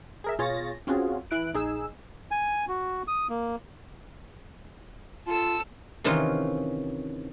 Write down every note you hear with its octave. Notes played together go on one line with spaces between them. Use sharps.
G#4 A#4 E5
B2 F4 G#4 C#5 A6 A#6
C4 C#4 F4 F#4 G#4
E3 E4 F#6 D7
A#1 D#4 G#4 E6
G#5
F#4
D#6
A#3
F4 A4 E6
C3 D#3 E3 C#4 D#4 F4